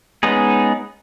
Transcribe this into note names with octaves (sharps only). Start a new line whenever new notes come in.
G#3 B3 C#4 D#4 G#4